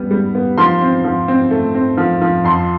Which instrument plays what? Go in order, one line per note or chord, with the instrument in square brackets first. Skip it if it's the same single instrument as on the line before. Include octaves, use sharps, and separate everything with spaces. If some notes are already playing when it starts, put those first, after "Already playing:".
Already playing: [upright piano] G3 B3
G3
B3
F3 C6
C4
F3
C4
A3
C4
F3
F3
F2 C6